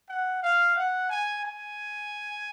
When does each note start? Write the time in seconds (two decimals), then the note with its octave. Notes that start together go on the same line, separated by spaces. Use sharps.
0.09 F#5
0.43 F5
0.76 F#5
1.10 G#5
1.43 G#5